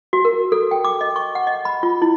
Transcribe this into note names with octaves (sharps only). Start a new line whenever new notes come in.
F#4
A#4
A4
G5
D6
D#5
C#6
F#5
D#5
B5
F4
E4